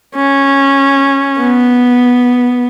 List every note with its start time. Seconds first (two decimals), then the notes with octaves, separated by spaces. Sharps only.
0.15 C#4
1.39 B3